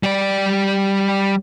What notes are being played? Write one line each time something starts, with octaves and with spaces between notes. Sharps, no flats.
G3 D5